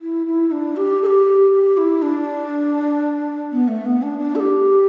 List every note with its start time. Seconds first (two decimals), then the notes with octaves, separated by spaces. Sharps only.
0.01 E4
0.27 E4
0.51 D4
0.76 G4
1.03 A4
1.06 G4
1.53 G4
1.77 E4
2.02 D4
3.52 B3
3.68 A3
3.85 B3
4.02 D4
4.19 D4
4.35 A4
4.40 G4